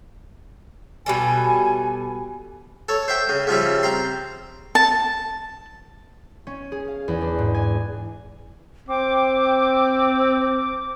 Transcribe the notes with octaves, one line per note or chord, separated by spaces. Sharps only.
B2 G3 A4 G#5
A4 C#5
C5 E5 G5
C#3
C#3 F3 G3 E4
C4 A#5 C6
A5
C#4
G#4
F5
E2
D4
G#2
G#5
C4 G5 D6